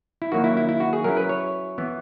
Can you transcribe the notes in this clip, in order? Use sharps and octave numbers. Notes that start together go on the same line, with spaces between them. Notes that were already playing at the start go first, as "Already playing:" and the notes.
E4
D#3 F#3 A#3 F#4
E4
E4
E4
F#4
G#4
F#3 C#4 E4 A#4
B4
C#5
E3 B3 E4